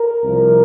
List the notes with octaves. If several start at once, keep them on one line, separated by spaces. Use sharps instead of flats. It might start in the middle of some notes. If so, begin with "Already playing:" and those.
Already playing: A#4
C2 C3 F3